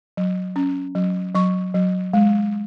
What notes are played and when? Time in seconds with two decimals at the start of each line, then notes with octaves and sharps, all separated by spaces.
0.17 F#3
0.56 C#4
0.95 F#3
1.34 F#3 C#6
1.74 F#3
2.13 G#3